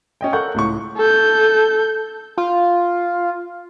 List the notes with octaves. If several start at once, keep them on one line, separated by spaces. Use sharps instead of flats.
C#4 D#5 G5
A4 A#4 F#5 C#6 F#6 G6
C#2 A2 C#6
A4 G6
F4